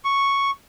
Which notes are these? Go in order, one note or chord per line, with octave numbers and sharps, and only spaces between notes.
C#6